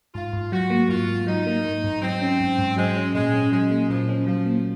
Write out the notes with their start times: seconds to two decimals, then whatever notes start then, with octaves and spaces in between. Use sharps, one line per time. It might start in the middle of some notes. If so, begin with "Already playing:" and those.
0.14 G#2 F4
0.33 G#2
0.52 F#3 F#4
0.70 A#3
0.89 G#2 F4
1.08 G#2
1.27 F#3 D#4
1.46 A#3
1.65 G#2
1.84 G#2
2.02 F#3 C4
2.21 C#4
2.40 G#2
2.59 G#2
2.77 F#3 G#3
2.96 C#4
3.14 A#2 G#3
3.34 C#4
3.52 F#3 G#3
3.71 A#3
3.90 A#2 F3
4.09 C#4
4.27 F3 F#3
4.46 A#3